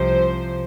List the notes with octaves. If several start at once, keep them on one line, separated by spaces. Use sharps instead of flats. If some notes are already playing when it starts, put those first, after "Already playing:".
Already playing: C2 C3 F3 C5